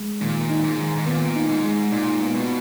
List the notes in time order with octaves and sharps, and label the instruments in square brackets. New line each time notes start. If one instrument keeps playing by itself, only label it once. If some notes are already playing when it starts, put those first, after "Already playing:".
Already playing: [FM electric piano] G#3
[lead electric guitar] A#2 [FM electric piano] D#3
[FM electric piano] D#4
[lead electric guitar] G#2
[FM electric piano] D#3
[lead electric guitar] G#2
[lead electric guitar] A#2 [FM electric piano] B3
[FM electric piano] D#4
[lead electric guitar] G#2
[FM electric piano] G#3
[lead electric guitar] A#2 [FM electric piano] D#4
[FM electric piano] B3
[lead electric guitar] B2